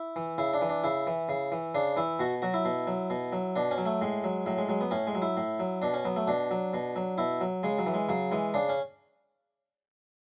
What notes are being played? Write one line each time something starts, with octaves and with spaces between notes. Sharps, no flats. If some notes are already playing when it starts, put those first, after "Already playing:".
Already playing: E4
E3
C#3 E4
D4
E3
D4
C#3 E4
E3
C#3
E3
C#3 D4
E3 E4
B2 F#4
F#3 F#4
E4
B2
F#3
B2
F#3
B2 D4
C#4
F#3
A3
A2 G#3
F#3
A2 F#3
G#3
F#3 G#3
B3
A2 C#4
G#3
F#3
E4
A2
F#3
B2 D4
C#4
F#3 B3
A3
B2 D4
F#3
B2
F#3
B2 E4
F#3
C#3 G#3
F#3
E3
G#3
C#3 F#3
E3 G#3
C#3 D4
C#4